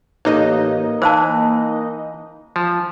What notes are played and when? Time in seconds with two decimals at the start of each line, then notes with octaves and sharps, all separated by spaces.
0.25 A1 A#3 D#4 D#5
1.02 E3 C5 F5 A5
2.56 F3